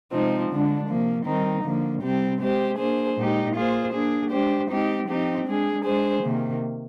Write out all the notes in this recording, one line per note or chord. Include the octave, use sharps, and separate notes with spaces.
C3 F3 G#3 C4 D#4
D3 G#3 D4
C3 F3 A#3
D#3 G3 C4 D#4
D3 F3 A#3
C3 G3 C4 G4
G#3 C4 G4 C5
A#3 D4 G#4 C5
A#2 G#3 D#4 G4
A#3 F4 G#4 C5
A#3 D4 G#4
G#3 D4 G4 C5
G#3 C4 D#4 G4
F3 C4 D#4 G4
G#3 D4 G#4
G#3 D4 G#4 C5
C3 D#3 A#3